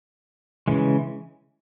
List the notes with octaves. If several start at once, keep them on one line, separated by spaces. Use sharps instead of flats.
C#3 E3 G#3